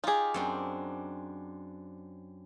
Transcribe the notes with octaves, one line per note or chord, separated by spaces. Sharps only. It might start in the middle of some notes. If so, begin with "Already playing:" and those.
D#4 F4 G4 G#4
F#2 C4 D4